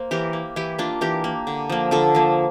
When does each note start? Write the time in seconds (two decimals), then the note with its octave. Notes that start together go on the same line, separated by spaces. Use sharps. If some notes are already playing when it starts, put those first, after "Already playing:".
Already playing: A#3 C5
0.11 E3 G4 A#4
0.33 A#3
0.56 E3 E4 G4
0.79 A#3 D4 F4
1.01 E3 G4 A#4
1.24 A#3
1.47 D3
1.70 F3 A#3
1.91 D3 F4 A4
2.15 F3 A#3